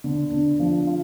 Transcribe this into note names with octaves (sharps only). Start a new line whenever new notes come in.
D3
D3
F3
F4